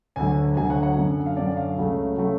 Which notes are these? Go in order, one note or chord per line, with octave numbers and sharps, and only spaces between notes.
D2 D3 F#3 G#5
D2 D3 F#3 G#5
F#5
F#5
F#2 D3 F#3
F5
F#2 D3 F#3 D5
F5
C#2 C#3 F#3 A3
C#3 F#3 A3